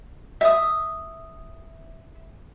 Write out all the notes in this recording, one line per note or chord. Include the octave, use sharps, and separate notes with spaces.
E5 D#6